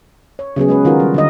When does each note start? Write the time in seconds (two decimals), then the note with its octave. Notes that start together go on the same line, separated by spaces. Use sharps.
0.39 C#5
0.56 C#3 F#3 B3 G#4
0.68 G#3 C#4 B4
0.85 D#3 F4 F#4 A#4
1.00 G3
1.14 D3 D#3 D#5